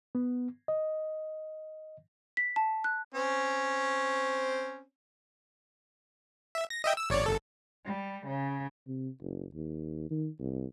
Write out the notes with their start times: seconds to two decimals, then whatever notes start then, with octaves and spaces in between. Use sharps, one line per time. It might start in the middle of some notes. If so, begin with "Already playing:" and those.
0.15 B3
0.68 D#5
2.37 B6
2.56 A5
2.84 F#6
3.14 C4 C#4
6.55 E5
6.70 A#6
6.84 D#5 E5 G5
6.97 E6
7.10 G#1 C#5 D5
7.26 G1 A4
7.85 G3
8.27 C#3
8.87 C3
9.22 F#1
9.54 D#2
10.10 D#3
10.39 C2